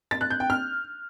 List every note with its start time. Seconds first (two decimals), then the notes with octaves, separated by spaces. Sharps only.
0.11 A6
0.21 F#6
0.30 G6
0.40 G5
0.50 F6